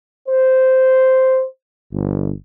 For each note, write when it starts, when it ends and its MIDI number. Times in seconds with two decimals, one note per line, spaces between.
0.28 1.45 72
1.92 2.30 31